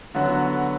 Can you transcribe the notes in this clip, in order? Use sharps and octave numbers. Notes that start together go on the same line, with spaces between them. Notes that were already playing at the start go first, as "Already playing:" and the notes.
D3 F#3 B3 F#4